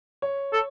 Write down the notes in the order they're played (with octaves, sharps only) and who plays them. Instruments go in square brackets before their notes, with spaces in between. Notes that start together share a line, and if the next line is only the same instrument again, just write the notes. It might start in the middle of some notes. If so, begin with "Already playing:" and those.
[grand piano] C#5
[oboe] A4